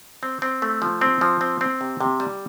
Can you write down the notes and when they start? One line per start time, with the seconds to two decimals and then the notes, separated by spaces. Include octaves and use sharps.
0.23 C4
0.42 C4
0.62 A3
0.82 F3
1.01 C4
1.21 F3
1.41 C4
1.61 C4
1.81 C3
2.01 C3
2.20 G3